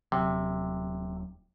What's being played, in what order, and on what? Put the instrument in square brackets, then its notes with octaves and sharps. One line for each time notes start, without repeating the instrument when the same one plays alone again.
[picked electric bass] D#1 G#1 F#3 [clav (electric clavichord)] C3